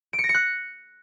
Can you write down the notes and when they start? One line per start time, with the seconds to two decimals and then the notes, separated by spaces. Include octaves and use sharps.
0.13 D7
0.18 C#7
0.24 A#6
0.29 C#7
0.34 F#6